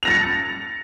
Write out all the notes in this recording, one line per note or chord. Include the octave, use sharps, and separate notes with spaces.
A6 A#6 C#7 F7